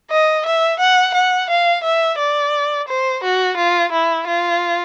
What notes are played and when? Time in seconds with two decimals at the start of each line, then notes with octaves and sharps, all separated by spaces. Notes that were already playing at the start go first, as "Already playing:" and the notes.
0.11 D#5
0.46 E5
0.80 F#5
1.15 F#5
1.50 F5
1.84 E5
2.19 D5
2.88 C5
3.23 F#4
3.57 F4
3.92 E4
4.27 F4